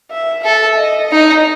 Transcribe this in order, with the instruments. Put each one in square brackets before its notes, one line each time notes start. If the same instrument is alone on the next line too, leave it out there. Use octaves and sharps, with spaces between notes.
[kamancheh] E5
[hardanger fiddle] A4 [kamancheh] E5
[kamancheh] D#5
[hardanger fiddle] D#4